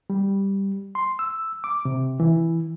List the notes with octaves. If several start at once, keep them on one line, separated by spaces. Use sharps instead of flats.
G3
C6
E6
D6
C3
E3